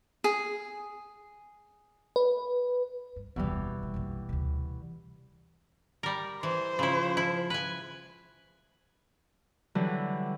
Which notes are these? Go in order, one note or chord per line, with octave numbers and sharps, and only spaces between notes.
G#4
B4
G2
F1 D2 B2 E3 G3
A3
A#1 F2
D2 C3
G3 A#4
E3 C5
C#3 F3 E4
E4
B4 G#5
D3 E3 F#3 G3